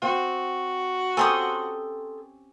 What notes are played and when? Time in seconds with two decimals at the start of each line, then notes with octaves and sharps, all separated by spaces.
0.02 C4 F#4
1.17 C4 C#4 G4 A4 G#5 A#5 C6 D#6